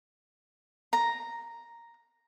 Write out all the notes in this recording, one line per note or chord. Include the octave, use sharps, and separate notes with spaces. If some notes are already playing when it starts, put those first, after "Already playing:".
A#5